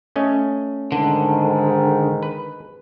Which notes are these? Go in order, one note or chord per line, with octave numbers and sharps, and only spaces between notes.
A3 C#4 D#5
G#2 D3 D#3
B4